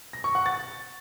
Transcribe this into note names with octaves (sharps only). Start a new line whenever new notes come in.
A#6
C#6
F#5
A6